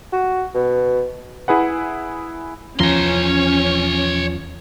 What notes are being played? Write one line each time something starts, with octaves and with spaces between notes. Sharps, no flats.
F#4
B2
E4 G#4 B4 F#5
E2 F3 C#4 C#5 A#5 C6